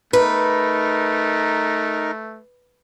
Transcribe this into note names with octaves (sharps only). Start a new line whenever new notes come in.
A3 D#4 A#4 B4